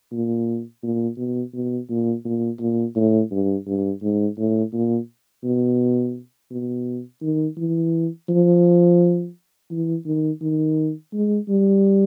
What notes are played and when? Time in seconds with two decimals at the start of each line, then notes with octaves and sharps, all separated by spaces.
0.12 A#2
0.83 A#2
1.17 B2
1.54 B2
1.89 A#2
2.25 A#2
2.60 A#2
2.96 A2
3.31 G2
3.67 G2
4.02 G#2
4.38 A2
4.73 A#2
5.44 B2
6.51 B2
7.22 D#3
7.57 E3
8.29 F3
9.71 E3
10.06 D#3
10.41 D#3
11.13 G#3
11.49 G3